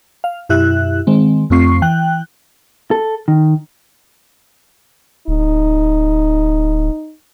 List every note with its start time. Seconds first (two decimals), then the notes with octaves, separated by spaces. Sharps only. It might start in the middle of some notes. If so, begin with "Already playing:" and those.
0.24 F5
0.49 F#2 B2 E4 G4 E5 F#6
1.07 D#3 G#3 C4
1.50 F2 A3 C4 F4 C#6 C7
1.82 E3 G5 F#6
2.91 A4
3.28 D#3
5.28 D1 D#4